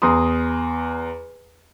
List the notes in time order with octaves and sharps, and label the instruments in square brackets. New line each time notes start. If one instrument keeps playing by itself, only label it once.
[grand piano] E2 A#5 C6 D#6